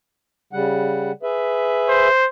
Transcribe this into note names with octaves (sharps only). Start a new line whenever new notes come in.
C#3 G3 F#5
G#4 B4 E5
C5